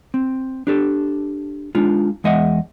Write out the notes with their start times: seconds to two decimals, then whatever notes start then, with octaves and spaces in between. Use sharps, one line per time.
0.14 C4
0.67 D4 G4 A4
1.75 G#3 D4 D#4 F4
2.24 E2 G#3 D#5 E5 F#5